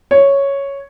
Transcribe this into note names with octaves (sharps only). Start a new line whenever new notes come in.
C#5